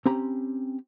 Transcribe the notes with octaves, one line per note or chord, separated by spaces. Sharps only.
C4 C#4 G4 A#5 B5